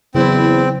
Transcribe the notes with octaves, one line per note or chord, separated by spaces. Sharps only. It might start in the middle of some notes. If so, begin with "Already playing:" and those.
E2 C#3 F#3 C4 E4 C5